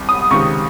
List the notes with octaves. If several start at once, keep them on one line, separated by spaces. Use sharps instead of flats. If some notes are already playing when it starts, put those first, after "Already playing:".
Already playing: C2
D#6
C#2 C3 D#3 C#6